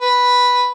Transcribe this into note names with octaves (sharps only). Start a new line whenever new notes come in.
B4